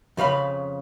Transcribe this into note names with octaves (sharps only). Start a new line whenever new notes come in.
F2 C#3 F5 B5